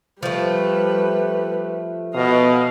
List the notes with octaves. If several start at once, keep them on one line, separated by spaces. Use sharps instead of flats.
F3 G3 A3 B4
B2 D#5 F5